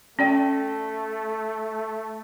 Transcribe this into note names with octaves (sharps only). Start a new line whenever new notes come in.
A3 C#4 D5 G5